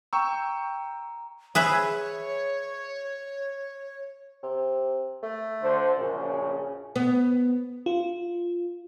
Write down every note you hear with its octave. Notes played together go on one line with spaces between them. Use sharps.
G5 A#5 C#6 E6
G#4 B4 C#5 E5
C3
A3
D2 D3 C5
A#1 F#2 C#3 C#4
B3
F4